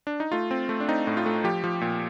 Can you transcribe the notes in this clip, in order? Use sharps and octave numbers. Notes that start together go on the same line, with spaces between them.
D4
D#4
A3 F4
C4
A3
D4
C4 D#4
A2
F4
A3
F3 G4
F3
A#2